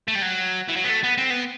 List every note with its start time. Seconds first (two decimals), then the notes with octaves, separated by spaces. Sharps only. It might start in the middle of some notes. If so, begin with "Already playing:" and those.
0.08 A3
0.15 G3
0.22 F#3
0.69 E3
0.77 F#3
0.84 B3
0.90 A3
1.04 B3
1.18 C4
1.30 B3